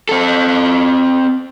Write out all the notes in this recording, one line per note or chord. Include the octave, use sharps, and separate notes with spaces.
C4 A4